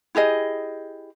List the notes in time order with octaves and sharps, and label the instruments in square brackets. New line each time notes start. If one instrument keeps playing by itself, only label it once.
[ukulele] E4 G4 G#4 D#5